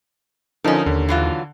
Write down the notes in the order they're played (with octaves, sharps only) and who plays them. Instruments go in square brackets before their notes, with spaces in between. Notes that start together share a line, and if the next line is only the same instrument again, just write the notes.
[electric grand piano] D3 F3 [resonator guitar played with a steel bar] C#4 A#4 [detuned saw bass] D#4
[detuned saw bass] D#2 [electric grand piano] D3
[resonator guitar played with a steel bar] E3 F#3 F4